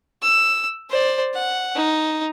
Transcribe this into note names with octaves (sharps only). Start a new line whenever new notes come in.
E6
C5 D5
F#5
D#4